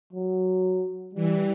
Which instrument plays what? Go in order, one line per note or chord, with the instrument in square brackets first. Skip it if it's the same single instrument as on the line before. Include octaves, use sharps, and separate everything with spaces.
[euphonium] F#3
[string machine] E3 [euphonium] G3